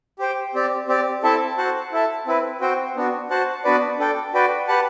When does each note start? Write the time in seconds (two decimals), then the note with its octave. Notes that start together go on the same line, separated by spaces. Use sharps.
0.19 G4 C5 G5
0.54 C4 G4 D5
0.88 C4 G4 D5
1.23 C4 E4 A4 E5 A5
1.57 F#4 C5 F#5 A5
1.92 E4 A4 E5 A5
2.26 C4 E4 B4
2.60 C4 F#4 C5 G5
2.96 B3 D4 F#4
3.30 F#4 C5 F#5 A5
3.64 B3 D4 F#4 B4 D5
3.99 D4 A4 D5 G5
4.34 F#4 B4 D5 G5
4.68 G4 B4 F#5 A5